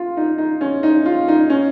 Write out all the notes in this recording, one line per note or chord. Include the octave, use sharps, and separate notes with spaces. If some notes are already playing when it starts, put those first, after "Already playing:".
Already playing: F4
D#4
D#4
C#4
D#4
F4
D#4
C#4